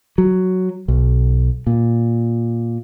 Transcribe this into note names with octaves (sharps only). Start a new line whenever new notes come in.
F#3
B1
A#2